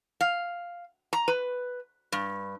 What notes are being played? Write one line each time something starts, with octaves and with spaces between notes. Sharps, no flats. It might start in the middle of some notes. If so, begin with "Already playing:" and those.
F5
A#5
B4
G2